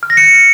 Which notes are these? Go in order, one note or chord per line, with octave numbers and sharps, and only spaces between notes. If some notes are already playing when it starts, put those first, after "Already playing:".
F6
A#6
C#7